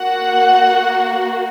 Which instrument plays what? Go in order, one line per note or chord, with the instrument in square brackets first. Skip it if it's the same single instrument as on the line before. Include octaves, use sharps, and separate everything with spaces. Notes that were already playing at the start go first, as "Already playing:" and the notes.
Already playing: [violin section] A#3 F#4 F#5